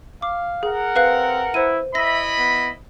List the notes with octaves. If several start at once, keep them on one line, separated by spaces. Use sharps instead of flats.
F5 D6
G#4 A#4 F#5
C4 B4 F5 F#6
E4 C5 D#7
E4 D#5 E5 B5 A#6
B3